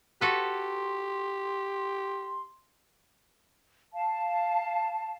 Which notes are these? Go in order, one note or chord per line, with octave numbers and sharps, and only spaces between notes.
F#4 G4 A4 B4 C6
F5 A5